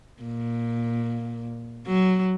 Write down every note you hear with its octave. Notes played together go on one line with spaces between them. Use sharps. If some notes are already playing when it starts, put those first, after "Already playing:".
A#2
F#3